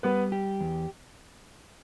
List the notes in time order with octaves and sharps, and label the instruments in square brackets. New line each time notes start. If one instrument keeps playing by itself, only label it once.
[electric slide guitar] G3 [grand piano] B3 B4
[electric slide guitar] G4
E2